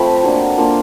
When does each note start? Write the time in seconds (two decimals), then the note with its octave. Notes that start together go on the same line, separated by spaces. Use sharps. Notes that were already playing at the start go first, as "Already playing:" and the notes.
Already playing: F3 A3 C4 F4 B5
0.23 F#3 A#3 D4
0.57 A#3 D4 F4